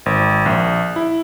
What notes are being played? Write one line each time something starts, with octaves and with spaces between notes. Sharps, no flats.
G#1
A#1
E4